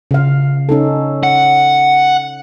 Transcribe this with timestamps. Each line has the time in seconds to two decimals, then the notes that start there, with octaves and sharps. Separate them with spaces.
0.11 C#3 F5
0.69 C#4 D#4 A4
1.23 F#5